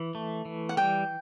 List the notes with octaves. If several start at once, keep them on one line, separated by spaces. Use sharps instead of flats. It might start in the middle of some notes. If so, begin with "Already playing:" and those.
Already playing: E3
A3
E3
F#5
G3 G5